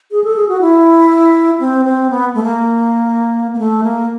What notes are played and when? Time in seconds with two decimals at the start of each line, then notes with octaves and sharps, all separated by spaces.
0.11 G#4
0.24 A4
0.36 G#4
0.49 F#4
0.61 E4
1.60 C4
1.85 C4
2.10 B3
2.35 A3
2.43 A#3
3.54 A#3
3.59 A3
3.84 A#3